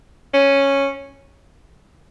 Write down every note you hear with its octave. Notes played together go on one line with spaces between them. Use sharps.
C#4